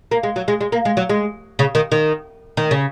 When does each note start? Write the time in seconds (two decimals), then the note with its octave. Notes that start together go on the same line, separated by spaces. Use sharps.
0.11 A#3
0.23 G#3
0.36 F#3
0.48 G#3
0.61 G#3
0.72 A#3
0.85 G#3
0.97 F#3
1.09 G#3
1.59 C#3
1.75 D#3
1.92 D#3
2.57 D#3
2.71 C#3